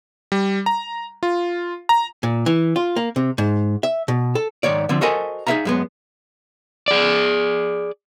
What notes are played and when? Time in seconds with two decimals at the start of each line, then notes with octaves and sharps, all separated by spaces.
0.32 G3
0.66 A#5
1.23 F4
1.89 A#5
2.23 A#2
2.46 E3
2.76 F4
2.96 A#3
3.16 C3
3.38 G#2
3.83 E5
4.08 B2
4.35 A4
4.63 G#2 D#3 C#5 D5
4.89 D3 F3 C4
5.01 F#4 A4 A#4 C5 D#5 G#5
5.47 D#4 G#4 A#4 E5 F5 A#5
5.65 F#2 G#3 B3
6.88 G#4 D5